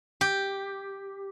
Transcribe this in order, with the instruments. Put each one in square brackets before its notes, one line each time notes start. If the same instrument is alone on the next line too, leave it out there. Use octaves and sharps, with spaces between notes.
[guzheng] G4